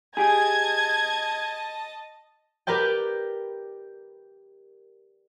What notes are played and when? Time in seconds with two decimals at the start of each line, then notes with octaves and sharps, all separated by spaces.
0.17 G4 G#4 D#5 A5 G#6
2.67 G4 A#4 B4 D5 G5